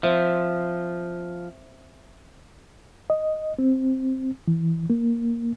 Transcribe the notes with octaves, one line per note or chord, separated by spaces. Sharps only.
F3 C4 C5 E5
D#5
C4
E3
A#3